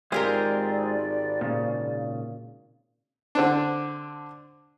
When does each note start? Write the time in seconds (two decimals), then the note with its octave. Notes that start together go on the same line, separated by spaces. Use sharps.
0.12 G#1 G#3 C4 F4 G4 G#4 A#4 D5
1.41 A#2 C#3
3.35 D3 C4 D4